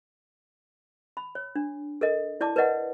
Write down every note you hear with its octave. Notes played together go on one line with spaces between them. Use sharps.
B5
C#5
D4
A4 A#4 D#5
E4 D5 A5 D6
A#4 B4 D5 D#5 F#5